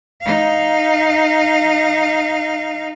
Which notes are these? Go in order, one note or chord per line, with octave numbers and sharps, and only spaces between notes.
D#4 F5